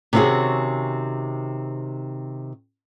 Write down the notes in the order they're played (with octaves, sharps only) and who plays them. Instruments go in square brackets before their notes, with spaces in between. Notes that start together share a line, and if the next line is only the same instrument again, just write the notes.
[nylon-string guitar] C3 D#3 C4 C#4 F#4 G#4